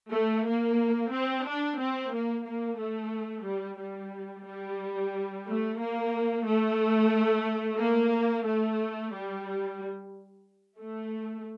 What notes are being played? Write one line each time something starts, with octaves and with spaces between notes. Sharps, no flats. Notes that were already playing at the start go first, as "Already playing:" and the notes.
A3
A#3
C4
D4
C4
A#3
A#3
A3
G3
G3
G3
A3
A#3
A3
A#3
A3
G3
A3